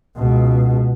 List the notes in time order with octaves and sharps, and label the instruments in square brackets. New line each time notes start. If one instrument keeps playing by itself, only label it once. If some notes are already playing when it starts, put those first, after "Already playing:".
[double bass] C#2 B2